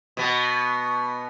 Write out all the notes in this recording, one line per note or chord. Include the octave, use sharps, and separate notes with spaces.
B2 B3